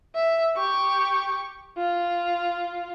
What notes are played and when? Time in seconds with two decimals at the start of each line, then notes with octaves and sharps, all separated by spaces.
0.15 E5
0.56 G4 C#6
1.78 F4